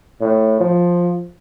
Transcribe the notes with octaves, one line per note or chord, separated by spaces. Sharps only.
A2
F3